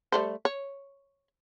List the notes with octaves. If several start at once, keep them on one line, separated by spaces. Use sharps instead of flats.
G3 A3 C5
C#5